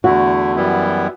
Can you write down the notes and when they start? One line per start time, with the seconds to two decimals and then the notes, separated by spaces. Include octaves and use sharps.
0.04 E2 D3 A3 E4 F#4
0.56 F#2 E3 G3 B3 E4